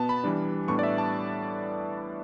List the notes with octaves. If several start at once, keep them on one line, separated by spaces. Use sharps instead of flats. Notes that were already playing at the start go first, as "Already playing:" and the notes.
Already playing: B2 B3 A5
B5
E3 G3 D4
A2 G3 B3 D4 C#6
D5
E5
A5